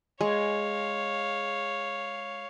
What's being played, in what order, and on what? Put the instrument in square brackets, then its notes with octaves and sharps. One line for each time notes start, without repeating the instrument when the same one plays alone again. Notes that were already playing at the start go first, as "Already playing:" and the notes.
[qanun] G#3 [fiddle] C#5 F5